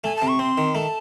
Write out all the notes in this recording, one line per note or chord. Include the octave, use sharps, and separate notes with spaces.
A3 G#5
A5
C3
C#6
C4 C6
D#3
A3 A5